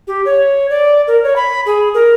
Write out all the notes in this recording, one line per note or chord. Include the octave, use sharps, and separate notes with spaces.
G4
C#5
D5
A#4
C#5
B5
G#4
A#4